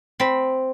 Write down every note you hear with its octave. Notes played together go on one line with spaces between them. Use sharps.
C4 B5